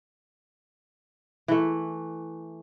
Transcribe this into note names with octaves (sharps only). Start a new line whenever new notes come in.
E3 A3